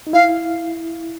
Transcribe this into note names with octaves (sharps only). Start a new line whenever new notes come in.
D#4
E4 F5